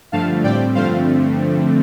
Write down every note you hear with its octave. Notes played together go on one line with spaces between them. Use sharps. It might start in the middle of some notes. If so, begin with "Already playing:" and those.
G2 D3 F3 A3 F5 A5
A2 G3 C4 D5 G5
G2 D3 F3 A3 C4 C5 F5